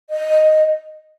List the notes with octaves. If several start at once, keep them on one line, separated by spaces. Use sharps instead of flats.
D#5